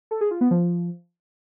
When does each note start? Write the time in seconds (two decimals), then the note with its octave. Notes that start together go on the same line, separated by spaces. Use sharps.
0.11 A4
0.21 G#4
0.31 F4
0.41 B3
0.51 F3